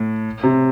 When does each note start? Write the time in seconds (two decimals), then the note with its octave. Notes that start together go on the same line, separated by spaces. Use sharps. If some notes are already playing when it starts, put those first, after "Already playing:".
Already playing: A2
0.43 C3